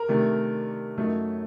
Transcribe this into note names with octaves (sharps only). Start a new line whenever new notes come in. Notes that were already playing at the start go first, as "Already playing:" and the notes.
Already playing: A#4
C3 D#3 A3 D4
F#2 F#3 A3 D#4